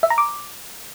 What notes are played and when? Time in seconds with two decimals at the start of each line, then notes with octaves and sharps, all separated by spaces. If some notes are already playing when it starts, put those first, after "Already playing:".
0.03 E5
0.10 A#5
0.18 D6